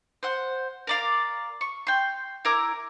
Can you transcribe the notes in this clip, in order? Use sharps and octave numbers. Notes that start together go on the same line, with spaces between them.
C5 F#5
A#4 D5 F5
C#6
G5 C6
E4 A#4 D6